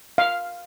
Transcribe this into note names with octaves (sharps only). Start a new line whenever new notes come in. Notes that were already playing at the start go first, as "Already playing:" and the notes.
F5